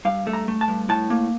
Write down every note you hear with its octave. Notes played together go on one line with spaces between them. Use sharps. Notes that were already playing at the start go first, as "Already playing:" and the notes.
G2 F5
A3
A#5
A3
A5
G2
A2 A5
A#3